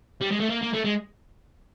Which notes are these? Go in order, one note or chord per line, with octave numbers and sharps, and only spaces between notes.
G3
G#3
A3
A#3
A#3
A3
G#3